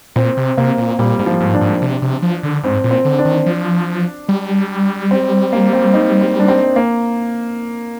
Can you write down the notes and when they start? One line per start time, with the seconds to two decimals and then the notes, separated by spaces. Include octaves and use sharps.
0.16 A#2 C4
0.37 C3
0.57 C3 A#3
0.78 A#2
0.99 A#2 G3
1.19 G#2
1.26 F3
1.40 G#2
1.54 D4
1.61 G#2
1.82 C3
2.02 C3
2.22 F3
2.43 D3
2.63 G#2 C4
2.84 A#2
2.91 C4
3.05 D3
3.19 D4
3.25 D#3
3.46 F3
4.29 G3
5.11 C4
5.53 A#3
5.73 C4
5.93 D#4
6.21 C4
6.39 D4
6.48 C4
6.76 A#3